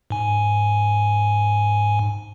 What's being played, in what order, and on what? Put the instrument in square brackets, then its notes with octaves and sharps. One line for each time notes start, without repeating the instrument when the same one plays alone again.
[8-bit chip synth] G#2 G#5